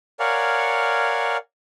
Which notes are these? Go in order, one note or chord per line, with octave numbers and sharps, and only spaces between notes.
A#4 C#5 D5 F5 F#5 G#5